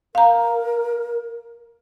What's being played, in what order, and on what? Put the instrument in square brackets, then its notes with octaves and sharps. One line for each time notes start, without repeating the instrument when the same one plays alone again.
[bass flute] A#4 [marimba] F5 A#5